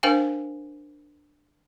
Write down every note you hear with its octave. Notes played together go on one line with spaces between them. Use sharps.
D4 A#4 C5 F5 G5 G#5